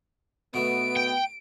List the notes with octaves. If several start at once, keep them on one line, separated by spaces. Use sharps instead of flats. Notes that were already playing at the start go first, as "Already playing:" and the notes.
B2 A3 B3 D7
G5